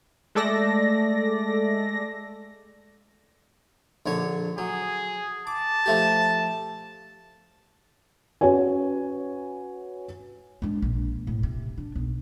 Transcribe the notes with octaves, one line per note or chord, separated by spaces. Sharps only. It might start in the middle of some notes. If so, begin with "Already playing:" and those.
G#3 A3 A4 D5 A#6
A#1 D3 C#5
F#3 G#4
A5 D6
F3 A3 G4
C#4 F#4 B4 C#5 G#5
G#3 D4
A#1
A2
C3
D4
B1